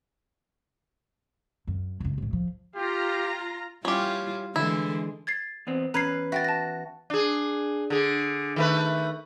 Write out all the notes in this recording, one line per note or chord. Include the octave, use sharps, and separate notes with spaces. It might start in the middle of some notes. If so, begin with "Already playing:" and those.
F#2
C#2 F#2
D2 A2
F3
F4 G4 A#5
G3 C#4 E4 F4 G4
D3 E3 G#3 E4
G#6 A6 C7
E2 B3 C4
E2 C#4 B4 A#5 G#6 C7
F#4 E5 G5 A6
A5 A#6
D4 G#4
D3 G#4
D#3 A3 B4